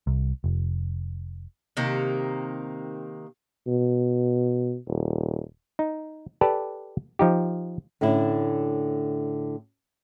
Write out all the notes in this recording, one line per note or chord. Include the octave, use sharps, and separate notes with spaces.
C2
F1
C3 D#3 A#3
B2
D#1
D#4
G4 A4 B4 D5 A5
F3 D#4 G4
A2 D3 C#4 E4